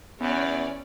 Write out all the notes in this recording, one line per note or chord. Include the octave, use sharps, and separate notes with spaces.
E2 B3 C#4 C#5 D5